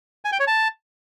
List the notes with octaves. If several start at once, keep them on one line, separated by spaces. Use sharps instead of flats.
G#5
G5
C#5
A5